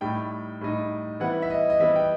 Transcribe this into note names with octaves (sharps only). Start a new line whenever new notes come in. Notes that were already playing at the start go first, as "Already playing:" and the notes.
A2 G3 D#4 G5
A2 G3 D#4
E3 G3 B3 E4 F#5
E5
D#5
D#5
E3 G3 B3 E4 E5
G5